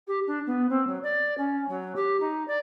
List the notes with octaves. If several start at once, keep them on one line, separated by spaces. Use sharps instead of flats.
G4
D4
B3
C4
F#3
D5
C#4
F#3
G4
D#4
D5